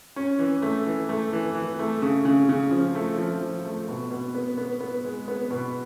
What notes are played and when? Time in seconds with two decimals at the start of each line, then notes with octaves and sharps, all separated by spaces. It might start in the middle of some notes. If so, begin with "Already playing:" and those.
0.16 C#4
0.39 E3
0.62 A3
0.86 E3
1.09 A3
1.33 E3
1.55 E3
1.79 A3
2.02 C#3
2.25 C#3
2.49 C#3
2.71 F3
2.95 A3
3.18 F3
3.41 F3
3.65 A3
3.88 B2
4.11 B2
4.35 B3
4.58 B3
4.80 B3
5.05 G#3
5.28 B3
5.51 B2